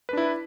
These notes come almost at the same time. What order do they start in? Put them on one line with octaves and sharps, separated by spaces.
B4 D4 E4